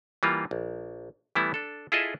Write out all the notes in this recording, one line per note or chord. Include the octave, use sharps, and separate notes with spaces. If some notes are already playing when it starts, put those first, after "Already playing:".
E3 G3 A#3 F4
A#1
E3 G3 A3 B3 E4
D4 A4
E4 F4 G#4 A4 D#5 E5